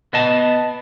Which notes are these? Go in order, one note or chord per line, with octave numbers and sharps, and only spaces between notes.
B3 D#5 A5